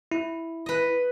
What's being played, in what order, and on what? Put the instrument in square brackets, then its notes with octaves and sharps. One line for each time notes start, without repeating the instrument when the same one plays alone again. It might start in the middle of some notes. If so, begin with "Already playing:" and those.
[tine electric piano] E4
[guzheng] B4 D#5